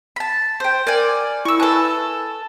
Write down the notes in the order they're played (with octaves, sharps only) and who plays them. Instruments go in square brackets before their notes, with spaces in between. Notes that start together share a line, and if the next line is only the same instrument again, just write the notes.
[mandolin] A5 B5
C5 G5
[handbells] A#4 [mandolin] D5 F#5 G#5
[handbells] E4 [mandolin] C#6 E6
[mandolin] A4 F#6 [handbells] B4 G#5 A5